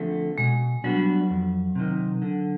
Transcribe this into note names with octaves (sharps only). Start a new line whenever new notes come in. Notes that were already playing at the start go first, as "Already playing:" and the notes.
Already playing: D3 F3 A3 C4
B2 G#3
F#3 G3 B3 D4 F#4
F2
C3 D#3
D3